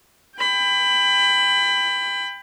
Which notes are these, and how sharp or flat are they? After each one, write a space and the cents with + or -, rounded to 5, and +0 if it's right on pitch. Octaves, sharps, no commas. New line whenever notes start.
G5 +25 B5 +20